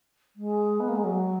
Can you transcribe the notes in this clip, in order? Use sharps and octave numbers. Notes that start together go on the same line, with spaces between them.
G#3
B3
A#3
G#3
F#3